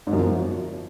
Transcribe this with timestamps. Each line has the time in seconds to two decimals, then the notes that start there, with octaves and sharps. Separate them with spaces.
0.07 G#2
0.13 F#2
0.19 F3